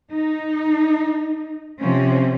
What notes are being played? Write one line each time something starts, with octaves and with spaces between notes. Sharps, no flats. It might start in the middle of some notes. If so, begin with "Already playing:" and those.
D#4
C3 F3 C4 C#4